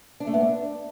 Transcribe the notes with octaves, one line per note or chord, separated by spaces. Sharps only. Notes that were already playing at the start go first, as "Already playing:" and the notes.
D4
A3
B3
D4